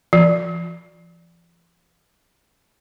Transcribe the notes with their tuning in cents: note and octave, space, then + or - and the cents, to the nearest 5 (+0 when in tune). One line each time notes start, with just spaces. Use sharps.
F3 -45